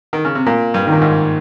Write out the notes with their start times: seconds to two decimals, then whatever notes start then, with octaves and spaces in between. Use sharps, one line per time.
0.13 D#3
0.25 C#3
0.35 C3
0.46 A#2 A#3
0.74 G2
0.87 A#2 D#3
1.02 G#2